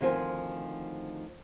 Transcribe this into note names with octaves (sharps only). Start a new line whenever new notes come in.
D2 D#3 F3 C4 G#5